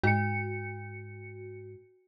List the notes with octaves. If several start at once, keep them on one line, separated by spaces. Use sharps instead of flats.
G#2 F#4 C#7